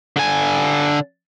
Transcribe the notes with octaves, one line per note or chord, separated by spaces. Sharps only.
D3 G#5